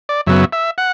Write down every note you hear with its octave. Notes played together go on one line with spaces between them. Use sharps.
D5
F#2 C#3 F#3 B3 E5
E5
F#5